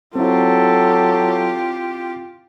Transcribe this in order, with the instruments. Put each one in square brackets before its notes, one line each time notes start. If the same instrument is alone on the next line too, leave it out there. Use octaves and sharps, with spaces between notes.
[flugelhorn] F#3 [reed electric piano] C4 E4 [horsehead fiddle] F4 G4 [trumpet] A4